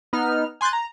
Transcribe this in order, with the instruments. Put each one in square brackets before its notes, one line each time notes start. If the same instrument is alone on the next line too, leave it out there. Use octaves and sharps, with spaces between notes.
[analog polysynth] B3 D#4 F6
G#5 C6 F#6 G6 A6
A#5